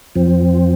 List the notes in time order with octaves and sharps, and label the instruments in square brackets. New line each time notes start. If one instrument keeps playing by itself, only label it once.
[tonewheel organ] F2 F3 C4